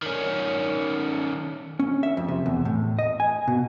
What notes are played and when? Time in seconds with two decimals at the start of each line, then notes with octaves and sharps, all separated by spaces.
0.02 D#3 C#4
1.80 C#4
2.03 E5
2.17 F2
2.28 C3
2.46 E2
2.65 A2
2.99 D#5
3.20 G#5
3.48 B2